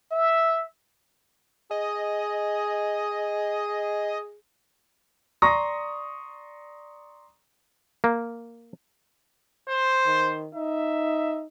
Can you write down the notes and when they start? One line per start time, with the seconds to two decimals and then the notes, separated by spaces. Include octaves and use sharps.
0.12 E5
1.71 G#4 D#5
5.42 D5 A#5 C6 C#6 D#6 A#6
8.04 A#3
9.69 C5
10.06 D#3
10.55 D#4 E5